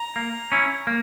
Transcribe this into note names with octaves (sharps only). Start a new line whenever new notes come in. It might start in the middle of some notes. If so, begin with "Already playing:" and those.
Already playing: A#5
A#3
C#4 E4
A#3